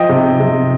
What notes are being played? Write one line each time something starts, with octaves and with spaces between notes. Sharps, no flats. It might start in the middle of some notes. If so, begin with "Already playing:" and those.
Already playing: F3 D#5 G5
C3
C3